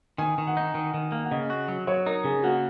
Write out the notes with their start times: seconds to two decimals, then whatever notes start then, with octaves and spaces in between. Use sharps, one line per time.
0.18 D#3 G#5
0.38 D#3
0.47 F#5
0.57 D#4
0.75 D#3
0.94 D#3
1.12 A#3
1.24 F#5
1.31 C#3 D#5
1.50 F#4
1.68 F#3
1.87 F#3 C#5
2.06 D#4 A#4
2.24 C#3 G#4
2.43 A#3 F#4